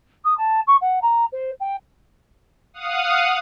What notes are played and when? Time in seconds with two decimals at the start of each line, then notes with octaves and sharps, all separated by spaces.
0.24 D#6
0.37 A5
0.67 C#6
0.81 F#5
1.02 A#5
1.32 C5
1.60 G5
2.74 F5 F#5 D#6